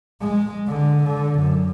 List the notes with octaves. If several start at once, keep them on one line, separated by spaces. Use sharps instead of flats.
G#3
D3
D3
F#2